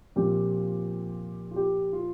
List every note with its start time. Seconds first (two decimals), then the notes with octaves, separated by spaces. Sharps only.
0.16 A#2 F3 C4 G4
1.51 F4
1.56 G4
1.93 F4